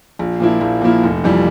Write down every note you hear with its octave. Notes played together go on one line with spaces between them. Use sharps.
A#1
A#2 F3 A#3 E4
A#1
A#2 F3 A#3 E4
F1
F2 E3 G3